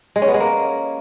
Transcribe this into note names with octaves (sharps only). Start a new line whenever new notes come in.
G#3
C#4
B3
G#3
A#3